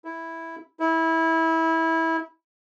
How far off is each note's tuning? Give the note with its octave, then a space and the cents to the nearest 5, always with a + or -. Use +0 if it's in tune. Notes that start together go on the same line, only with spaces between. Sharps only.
E4 -5
E4 -20